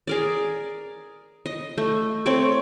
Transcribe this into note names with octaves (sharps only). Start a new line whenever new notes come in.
G#4 A#4 D5
D#5
A3
A3 C4 C#5 D5